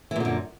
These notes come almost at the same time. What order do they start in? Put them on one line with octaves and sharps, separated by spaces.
E3 A#2 D3 F#2